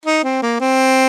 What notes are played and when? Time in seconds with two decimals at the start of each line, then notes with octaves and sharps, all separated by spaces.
0.06 D#4
0.24 C4
0.42 A#3
0.60 C4